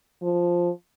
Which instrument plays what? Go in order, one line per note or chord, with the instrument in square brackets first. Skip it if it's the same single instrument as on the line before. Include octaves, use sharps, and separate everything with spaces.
[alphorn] F3